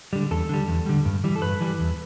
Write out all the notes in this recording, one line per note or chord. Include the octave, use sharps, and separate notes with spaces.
D3 G3
E2 A4
D3 G3
E2
D3 G3
G2
E3 G3
A4
G2 B4
E3 G3
E2